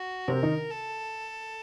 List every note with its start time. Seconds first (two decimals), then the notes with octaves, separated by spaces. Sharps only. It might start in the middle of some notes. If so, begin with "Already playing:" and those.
Already playing: F#4
0.28 C3 C4 A#4
0.43 D#3 D#4
0.71 A4